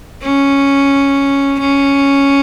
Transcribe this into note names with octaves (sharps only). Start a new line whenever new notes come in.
C#4
C#4